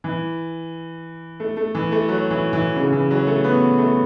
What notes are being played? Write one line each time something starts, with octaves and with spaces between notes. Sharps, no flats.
E3
A3
A3
E3
A3
F#3
E3
E3
C#3
E3
F#3
A3
B3
A3